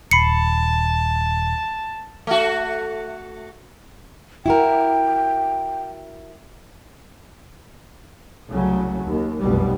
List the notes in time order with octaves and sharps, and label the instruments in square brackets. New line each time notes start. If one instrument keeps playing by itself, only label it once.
[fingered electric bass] D#1 [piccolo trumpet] A5 [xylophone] B5 C7 C#7
[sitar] A3 F#4
[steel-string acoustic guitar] E4 F#4 A#4 [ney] G5
[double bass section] C2 C#3 F#3 A3
D#2
F1 B1 F#2 B2 G3